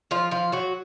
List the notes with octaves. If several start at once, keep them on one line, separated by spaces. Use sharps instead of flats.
F3 F4
F3 F4
F#3 F#4